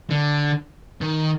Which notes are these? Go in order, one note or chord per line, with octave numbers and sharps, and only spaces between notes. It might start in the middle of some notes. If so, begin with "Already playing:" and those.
D3
D#3